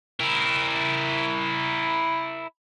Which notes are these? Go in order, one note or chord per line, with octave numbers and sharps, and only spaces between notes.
E4 A#4